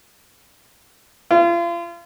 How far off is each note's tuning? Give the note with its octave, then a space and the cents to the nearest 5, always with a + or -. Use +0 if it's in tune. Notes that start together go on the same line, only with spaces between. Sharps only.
F4 -35